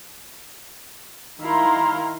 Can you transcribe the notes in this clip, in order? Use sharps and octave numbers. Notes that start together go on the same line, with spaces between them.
D#3 E4 F5 A#5 C6